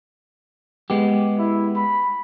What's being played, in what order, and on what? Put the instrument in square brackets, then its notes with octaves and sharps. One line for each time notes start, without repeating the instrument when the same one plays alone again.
[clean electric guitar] G#3 B3 G4
[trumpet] E4
B5